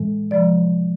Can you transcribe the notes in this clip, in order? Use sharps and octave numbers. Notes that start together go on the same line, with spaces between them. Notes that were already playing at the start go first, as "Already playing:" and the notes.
Already playing: A2 E3 G#3
C3 F3 G#3 D5